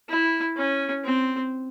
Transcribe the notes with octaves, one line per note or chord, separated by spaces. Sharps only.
E4
C#4
C4